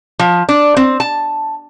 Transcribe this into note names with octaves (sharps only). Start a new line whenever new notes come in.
F3
D4
C4
A5